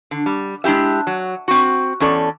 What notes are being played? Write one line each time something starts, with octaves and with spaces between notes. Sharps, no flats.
D3
G3
G#3 D4 E4 G4 E5
F#3
C4 F#4
E2 C#4 A4 D5